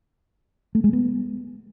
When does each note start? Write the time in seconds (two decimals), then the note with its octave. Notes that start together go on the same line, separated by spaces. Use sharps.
0.75 A3
0.84 G#3
0.93 B3